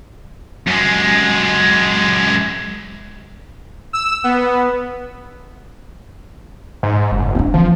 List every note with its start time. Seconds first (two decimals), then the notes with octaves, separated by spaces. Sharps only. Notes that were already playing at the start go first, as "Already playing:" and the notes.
0.68 F#2 G#3
3.93 E6
4.24 B3
6.83 G#2
7.12 F#1
7.35 C4 D4
7.54 E3 F3